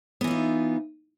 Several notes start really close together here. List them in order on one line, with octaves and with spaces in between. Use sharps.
B3 E3 F4 D#4